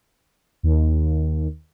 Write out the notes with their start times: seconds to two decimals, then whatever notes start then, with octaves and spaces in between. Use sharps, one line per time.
0.63 D#2